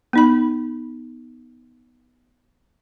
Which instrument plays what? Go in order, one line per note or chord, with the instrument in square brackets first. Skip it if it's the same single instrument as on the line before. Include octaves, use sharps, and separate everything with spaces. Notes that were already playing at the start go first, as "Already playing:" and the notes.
[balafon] B3 D#4 B5